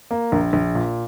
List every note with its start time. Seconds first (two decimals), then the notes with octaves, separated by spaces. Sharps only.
0.11 A#3
0.32 A#1
0.53 A#1
0.75 A#2